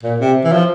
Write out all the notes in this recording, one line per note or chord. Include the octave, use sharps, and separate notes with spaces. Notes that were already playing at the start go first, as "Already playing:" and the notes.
A#2
C3
E3
F3